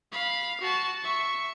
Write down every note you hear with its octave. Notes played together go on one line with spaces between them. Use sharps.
F5 B5
F#4 A5
E5 C#6